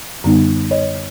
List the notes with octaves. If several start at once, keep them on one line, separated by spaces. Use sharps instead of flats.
F#2 D3 G3 B3 D#4
C#5 D#5